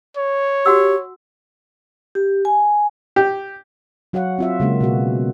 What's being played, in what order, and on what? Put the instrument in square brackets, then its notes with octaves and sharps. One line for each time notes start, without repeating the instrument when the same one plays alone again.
[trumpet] C#5
[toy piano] F#4 F#5 E6 [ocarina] G4
[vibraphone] G4
G#5
[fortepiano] G4
[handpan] F#3 F#4 C#5 F5 F#5
C4 F4 E5
C#3 G#3 A#3 C#4
B2 B3 F#4